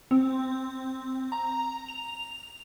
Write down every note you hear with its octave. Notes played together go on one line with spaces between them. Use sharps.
C4
A#5
F7